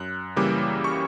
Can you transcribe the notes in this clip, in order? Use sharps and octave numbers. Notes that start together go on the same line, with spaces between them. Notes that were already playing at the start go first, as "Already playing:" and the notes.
Already playing: F#2 F#6
C#3 E3 G3 A#3 D6
C#6